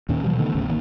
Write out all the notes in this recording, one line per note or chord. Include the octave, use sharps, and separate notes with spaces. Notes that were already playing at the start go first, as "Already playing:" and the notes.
D#2 A#2 D#3 C#4
B2 E3 F#3 G3
D3 D#3 A3 B3
A1 D2 A2 C#3
A1 G2 D#3 A#3